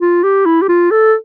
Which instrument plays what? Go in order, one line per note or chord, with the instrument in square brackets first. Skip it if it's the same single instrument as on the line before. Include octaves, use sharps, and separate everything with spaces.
[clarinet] F4
G4
E4
G4
F4
A4